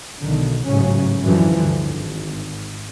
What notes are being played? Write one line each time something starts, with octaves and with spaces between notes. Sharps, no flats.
B1 D3 D#3
A1 G#2 C#3 F#3 C#4
F#2 D3 E3 F3
D2 G2 D3
G#1